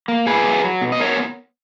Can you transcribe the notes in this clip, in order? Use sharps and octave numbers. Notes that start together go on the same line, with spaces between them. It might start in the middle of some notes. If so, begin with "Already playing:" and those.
A#3
B2 G#4 B4
F#3
F#3
B2
D#5
B3 A#4 C#5